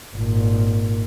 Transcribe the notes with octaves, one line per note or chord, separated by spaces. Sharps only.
G#1 A#2